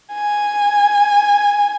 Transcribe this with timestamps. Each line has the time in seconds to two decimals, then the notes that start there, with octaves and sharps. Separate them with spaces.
0.13 G#5